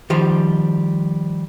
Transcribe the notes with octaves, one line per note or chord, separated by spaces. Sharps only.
D#3 F3 G3 G4 C5